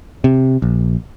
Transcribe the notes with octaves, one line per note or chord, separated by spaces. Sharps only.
C3
A#1